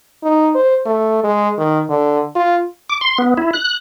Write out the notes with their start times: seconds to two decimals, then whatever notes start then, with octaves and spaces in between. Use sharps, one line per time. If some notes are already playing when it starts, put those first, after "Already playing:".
0.23 D#4
0.55 C5
0.86 A3
1.24 G#3
1.58 D#3
1.90 D3
2.35 F4
2.90 D6
3.01 C6
3.18 B3
3.37 E4
3.53 F#6